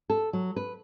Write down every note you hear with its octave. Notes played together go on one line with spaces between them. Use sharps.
A4
F#3
B4